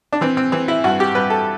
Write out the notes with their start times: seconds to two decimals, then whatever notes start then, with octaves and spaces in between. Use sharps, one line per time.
0.13 D4
0.21 E3 C4
0.37 C4
0.52 E3 C4
0.68 E4
0.84 G2 F#4
1.00 G4
1.15 G2 B4
1.30 A4